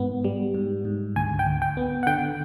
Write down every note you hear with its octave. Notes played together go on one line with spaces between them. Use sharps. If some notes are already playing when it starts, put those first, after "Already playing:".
Already playing: G#2 B3
G3
G#2
G#2
D2 G#5
G5
D2
G5
B3
F#5
D3 G5